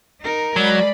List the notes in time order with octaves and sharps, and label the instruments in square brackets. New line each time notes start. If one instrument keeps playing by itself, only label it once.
[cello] D#4 A#4
[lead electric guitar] F#3 [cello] G#3 [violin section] D5 B5